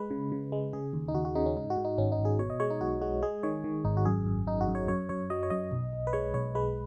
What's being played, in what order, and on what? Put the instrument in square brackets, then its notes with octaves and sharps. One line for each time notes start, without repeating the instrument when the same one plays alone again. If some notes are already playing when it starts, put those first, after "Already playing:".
Already playing: [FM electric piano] G#3 B4
C#3
C#3
G#3
C#3 G#4
D#2
D#4
D#2 F#4
F#4
C#3 D#4
C#4
G#2 D#4
F#4
G#2
D#4
G#1 C#4
D#4
G#1
G#4
B2 C#5
D#5
G#3 C#5
D#4
B1 F#4
G#3 F#4
G#3 G#4
D#3 C#5
D#3
G#1 D#4
F#4
F#2 G#4
F#2
F#2 D#4
F#4
F#2
C#5
F#2 C#5
F#2 C#5
F#3 D#5
C#5
F#2 D#5
B1
B1
B4
G#3 C#5
B1 C#5
G#3 B4